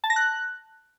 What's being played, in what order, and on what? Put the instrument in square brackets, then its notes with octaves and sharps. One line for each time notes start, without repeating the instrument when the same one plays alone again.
[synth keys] A5
A#6
F#6